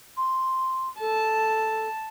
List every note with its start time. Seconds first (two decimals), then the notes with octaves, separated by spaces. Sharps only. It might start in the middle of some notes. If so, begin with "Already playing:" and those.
0.17 C6
1.00 A4 A5